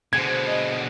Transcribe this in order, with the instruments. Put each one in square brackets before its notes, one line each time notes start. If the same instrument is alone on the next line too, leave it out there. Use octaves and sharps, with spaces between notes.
[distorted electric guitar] B2 D3 [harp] G#4 C5 [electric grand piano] G#6
[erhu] D#5